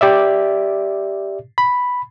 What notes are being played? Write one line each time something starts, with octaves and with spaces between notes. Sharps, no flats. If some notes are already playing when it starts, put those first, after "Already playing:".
G4 D5 E5
B5